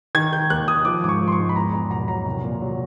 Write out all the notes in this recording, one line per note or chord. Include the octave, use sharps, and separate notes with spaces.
D#3 G#6
D#3 G6
D#2 F#6
D#3 D#6
F3 D6
G#2 D6
C#6
F3
C6
C#6
G#2
B5
E2 A#5
E2 A#5
B2 A#5
F#3 A#5
C2
A#2
F#3